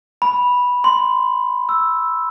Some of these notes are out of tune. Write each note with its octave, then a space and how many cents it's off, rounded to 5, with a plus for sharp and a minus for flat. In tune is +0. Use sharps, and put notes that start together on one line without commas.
B5 -10
C6 -15
E6 +0